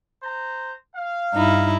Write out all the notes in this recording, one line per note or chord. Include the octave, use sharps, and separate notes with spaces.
C5 A#5
F5
G2 D#4 E4